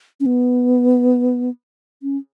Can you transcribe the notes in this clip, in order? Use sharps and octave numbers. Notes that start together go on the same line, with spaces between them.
C#4
B3
C#4